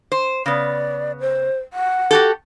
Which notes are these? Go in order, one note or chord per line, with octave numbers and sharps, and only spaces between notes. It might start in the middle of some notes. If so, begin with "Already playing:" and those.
C5
C#3 B3 D5
C5
F#5
F#4 G4 A4